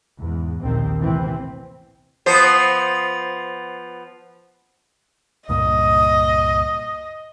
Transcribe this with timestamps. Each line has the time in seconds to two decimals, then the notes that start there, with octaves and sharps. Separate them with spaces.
0.21 E2 G#2
0.61 A#1 D#2 D#3 C4
1.00 A2 C3 E3 C4
2.26 F3 B3 C5
5.49 C#2 G2 A#2 D#5 D#6